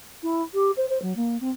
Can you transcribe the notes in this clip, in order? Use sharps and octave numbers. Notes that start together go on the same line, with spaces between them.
E4
G4
C5
C5
F#3
A#3
C4